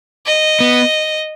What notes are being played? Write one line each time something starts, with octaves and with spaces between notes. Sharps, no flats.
D#5
B3